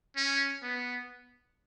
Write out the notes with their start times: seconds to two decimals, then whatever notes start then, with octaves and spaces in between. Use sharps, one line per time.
0.17 C#4
0.63 B3